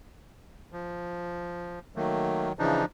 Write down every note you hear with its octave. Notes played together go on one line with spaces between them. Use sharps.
F3
D#3 F#3 A3 A#3
C#3 E3 F3 D4 D#4